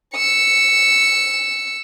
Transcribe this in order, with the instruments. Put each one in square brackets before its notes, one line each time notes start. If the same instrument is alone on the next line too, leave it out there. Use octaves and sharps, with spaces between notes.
[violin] E6 C#7